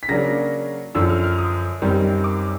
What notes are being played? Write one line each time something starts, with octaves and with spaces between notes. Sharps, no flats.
B6
C#3 F#3 A#3 D4 A#6
F#2 D3 F3 E6
F6
F6
D#6
F#2 D#3 G3 C4
D6